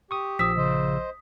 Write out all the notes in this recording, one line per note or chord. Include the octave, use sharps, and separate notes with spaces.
G4 C#6 D#6
A#1 F3 D#6 E6 B6
C#3 C5 D#5